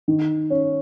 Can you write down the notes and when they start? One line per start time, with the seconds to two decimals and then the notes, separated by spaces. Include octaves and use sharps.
0.08 D#3
0.50 C#4